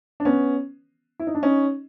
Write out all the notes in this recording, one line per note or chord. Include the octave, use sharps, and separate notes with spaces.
D4
B3 C#4
E4
D#4
D4
C#4 D#4